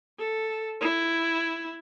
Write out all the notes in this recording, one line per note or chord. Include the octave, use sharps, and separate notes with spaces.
A4
E4